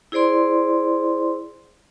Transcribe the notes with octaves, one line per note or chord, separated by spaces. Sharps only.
E4 G#4 C5 D5 C6